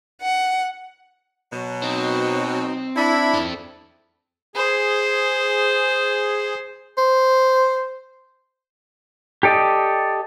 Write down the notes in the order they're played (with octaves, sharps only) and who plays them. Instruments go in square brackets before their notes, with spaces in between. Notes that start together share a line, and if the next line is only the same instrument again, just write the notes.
[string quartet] F#5
[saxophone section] B2 F#3
[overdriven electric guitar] C4 [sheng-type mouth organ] D#4
[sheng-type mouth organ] D4 E5 B5 [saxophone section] E4
[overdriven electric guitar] C4 A4
[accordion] G#4 [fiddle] C5
[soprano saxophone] C5
[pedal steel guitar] G4 A4 D5 D#5